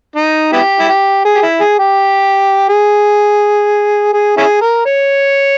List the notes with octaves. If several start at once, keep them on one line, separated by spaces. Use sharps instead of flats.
D#4
B3 E4 G4
E4
G4
G#4
G4
E4
G#4
G4
G#4
G#4
C#4 E4 G#4
A#4
C#5